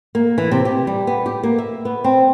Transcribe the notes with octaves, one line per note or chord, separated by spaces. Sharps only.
A#3
E3
C3
G4
G3
B3
G4
A#3
E5
B3
C4